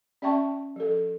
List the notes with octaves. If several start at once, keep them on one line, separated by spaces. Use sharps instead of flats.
C#4 D5 E5 G5 A5 C#6
F3 A4